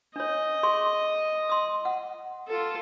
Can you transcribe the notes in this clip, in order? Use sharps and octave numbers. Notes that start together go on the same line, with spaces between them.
D4 C#5 D#5
G#4 C6 C#6
C6 D#6
F#5
F4 A4